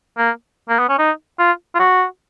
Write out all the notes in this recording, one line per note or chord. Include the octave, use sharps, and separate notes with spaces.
A#3
A#3
B3
C#4
D#4
F4
F4
F#4